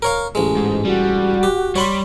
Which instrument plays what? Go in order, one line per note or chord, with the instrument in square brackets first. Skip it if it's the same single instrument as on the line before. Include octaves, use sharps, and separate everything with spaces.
[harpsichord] A#4 C#5 F5
A1 G#3
[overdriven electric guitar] G#2
[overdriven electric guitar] G3 [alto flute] F#4
[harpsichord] G4
[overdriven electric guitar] G3 [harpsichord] C#5 B5 C6